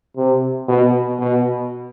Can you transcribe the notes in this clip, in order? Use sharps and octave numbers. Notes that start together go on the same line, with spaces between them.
C3
B2
B2